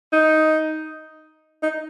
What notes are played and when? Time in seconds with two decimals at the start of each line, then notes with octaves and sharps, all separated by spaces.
0.12 D#4
1.63 D#4